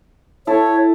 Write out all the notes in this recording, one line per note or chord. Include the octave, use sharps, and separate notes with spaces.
E4 A4 C#5 A5